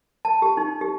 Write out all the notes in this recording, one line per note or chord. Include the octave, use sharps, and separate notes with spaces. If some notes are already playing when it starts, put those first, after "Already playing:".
A5
G4
D#4
G4